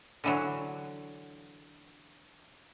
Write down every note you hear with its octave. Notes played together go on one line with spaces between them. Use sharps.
D3 E3 F#3